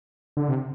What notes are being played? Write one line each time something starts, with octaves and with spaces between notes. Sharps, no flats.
D3
C3